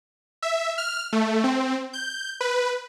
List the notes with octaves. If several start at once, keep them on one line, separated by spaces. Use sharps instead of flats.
E5
F6
A3
C4
G6
B4